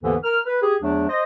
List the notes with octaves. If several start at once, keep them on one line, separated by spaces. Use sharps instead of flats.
D#2 G#2 D3 E3 B3
A#4 F6
B4
G4 G#4
E2 F#3 A3 D4
C5 D#5